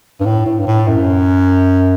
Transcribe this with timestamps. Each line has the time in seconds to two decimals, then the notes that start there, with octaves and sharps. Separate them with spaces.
0.20 G2
0.25 A2
0.46 A2
0.59 G2
0.67 A2
0.88 F#2